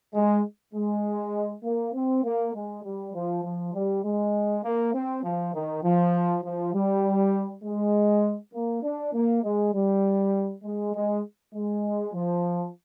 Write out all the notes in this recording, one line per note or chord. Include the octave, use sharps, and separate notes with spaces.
G#3
G#3
A#3
C4
A#3
G#3
G3
F3
F3
G3
G#3
A#3
C4
F3
D#3
F3
F3
G3
G#3
A#3
D4
A#3
G#3
G3
G#3
G#3
G#3
F3